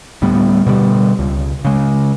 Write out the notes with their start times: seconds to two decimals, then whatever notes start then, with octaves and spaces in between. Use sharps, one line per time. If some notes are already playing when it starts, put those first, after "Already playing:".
0.22 D2 A2 G3 B3
0.67 B2 D3 G3
1.19 C#2
1.65 C#3 G#3